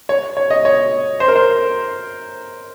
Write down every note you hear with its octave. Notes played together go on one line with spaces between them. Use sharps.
C#5
C#5
D#5
C#5
C5
A#4
C5